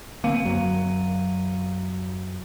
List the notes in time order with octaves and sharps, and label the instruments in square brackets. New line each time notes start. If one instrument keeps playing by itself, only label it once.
[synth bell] D3 F5 D#7 [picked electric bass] A#3 C4
[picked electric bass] F#2 F#3